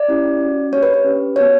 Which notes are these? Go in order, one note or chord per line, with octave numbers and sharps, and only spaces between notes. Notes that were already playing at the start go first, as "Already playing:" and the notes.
Already playing: D5
C#4 E4 G4
C#4 F#4
A#3 D4 G4 C#5
B4
B4
C#4 G4
B3 D4 F#4 C#5